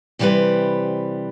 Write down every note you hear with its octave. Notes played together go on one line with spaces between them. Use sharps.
C3 E3 G3 F4 B4 C5